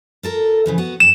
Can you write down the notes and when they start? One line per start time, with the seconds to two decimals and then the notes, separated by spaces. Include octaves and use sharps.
0.23 F4 A4 A#4
0.66 C#3 E3 F3
0.78 B3 F#4 F#5
1.00 F#2 E7